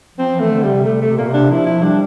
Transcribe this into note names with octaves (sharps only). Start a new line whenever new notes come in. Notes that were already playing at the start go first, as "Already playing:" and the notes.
F3 C4
E3
A3
D3
C3 G3
C3 A3
A3
C3
A#2 A#3
C3
D4
F3 E4
E4
G3 D4